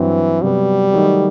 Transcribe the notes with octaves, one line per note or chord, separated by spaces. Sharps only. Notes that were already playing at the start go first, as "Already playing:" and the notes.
Already playing: G2 E3 F#3 C4
C3 F#3 G3 B3
D#3 F#3 A3 D#4